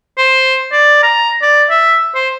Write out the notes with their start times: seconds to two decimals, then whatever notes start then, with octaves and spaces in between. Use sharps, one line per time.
0.18 C5
0.72 D5
1.03 A#5
1.42 D5
1.70 E5
2.15 C5